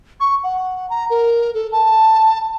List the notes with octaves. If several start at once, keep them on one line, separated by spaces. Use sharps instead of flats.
C#6
F#5
A#5
A#4
A4
A5